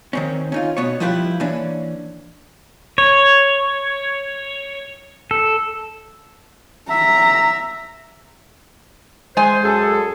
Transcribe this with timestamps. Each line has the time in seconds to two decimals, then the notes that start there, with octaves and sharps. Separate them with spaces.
0.13 D#3 C4 C#4
0.52 C#4 D#4 F4
0.77 B2 B3 C#5
1.00 F3 G3 E4 F4 G4 B4
1.40 E3 A#3 C#4 D4
2.98 C#5
5.31 A4
6.90 E5 A#5
9.37 G#3 C5 G#5
9.63 F#2 G#4 A4